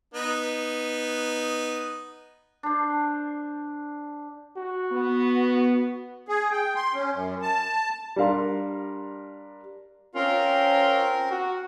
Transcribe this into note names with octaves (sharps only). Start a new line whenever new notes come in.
B3 D#4
D4 C5
F#4
B3
G#4
G5
C6
C#4
F#2
A5
G3 D4 A#4 F5 C6
C4 C#4 F4 A#4
F#4